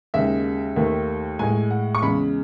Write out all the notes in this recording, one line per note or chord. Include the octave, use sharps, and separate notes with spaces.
D#2 C#3 G#3 E5
D#2 D#3 A3
A2 G#3 G#5
F#5
C#6
E2 C#3 G#3 B5